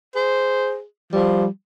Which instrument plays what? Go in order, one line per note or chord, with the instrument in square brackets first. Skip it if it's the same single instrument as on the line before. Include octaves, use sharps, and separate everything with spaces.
[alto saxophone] G#4 [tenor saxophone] C5
[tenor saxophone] F3 [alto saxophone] G3